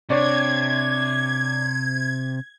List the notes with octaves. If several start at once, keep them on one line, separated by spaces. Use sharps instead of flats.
C3 D4 C#5 D5 G#6